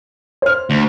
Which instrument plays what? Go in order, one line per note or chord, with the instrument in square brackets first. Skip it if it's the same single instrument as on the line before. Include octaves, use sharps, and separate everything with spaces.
[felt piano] C5 F6
[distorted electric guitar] D2